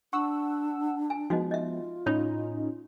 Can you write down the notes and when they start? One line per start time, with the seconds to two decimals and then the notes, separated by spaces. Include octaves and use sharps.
0.13 D4 F#5 C#6 E6
1.10 G#5
1.30 F3 G#3 B3 D#4 F#4 D#5
1.51 F4 D#5 E5
2.06 A2 C#4 D#4 C#5 B5